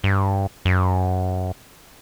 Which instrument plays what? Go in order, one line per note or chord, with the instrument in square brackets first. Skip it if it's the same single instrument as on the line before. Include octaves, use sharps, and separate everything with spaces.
[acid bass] G2
F#2